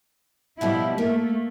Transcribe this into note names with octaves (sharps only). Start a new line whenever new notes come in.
B2 F3 G3 E4
A3 A#3